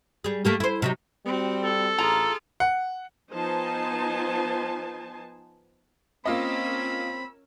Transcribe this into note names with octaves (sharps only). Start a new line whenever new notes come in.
G3 G#4
A3 A#3 G4
E4 C5
C3 F#3 D#4
G3 C4 F#4
A4
A1 F4 G#4 A#5
F#5
F3 B3 D#4 C5 G#5 A5
A#3 C4 C#4 F4 A#4 D#5 B5 E6